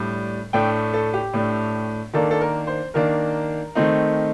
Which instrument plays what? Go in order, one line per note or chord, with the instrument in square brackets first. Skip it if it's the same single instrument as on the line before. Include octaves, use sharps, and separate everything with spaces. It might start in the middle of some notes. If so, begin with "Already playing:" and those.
Already playing: [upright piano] A2 G3 D4
A2 A3 D4 G5
A4
G4
A2 A3 D4
D#3 A#3 D4 A4
A4
A#4
C5
D#3 A#3 D4 A#4
D#3 A3 C4 D#4